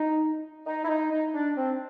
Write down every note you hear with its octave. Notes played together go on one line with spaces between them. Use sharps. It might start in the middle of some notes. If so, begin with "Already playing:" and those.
Already playing: D#4
D#4
E4
D#4
D#4
D4
C4